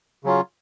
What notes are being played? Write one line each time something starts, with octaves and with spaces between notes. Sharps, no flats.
C#3 F#3 C#4 F4